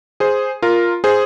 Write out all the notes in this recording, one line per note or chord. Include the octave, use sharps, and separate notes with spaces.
G#4 C5
F4 A#4
G#4 C5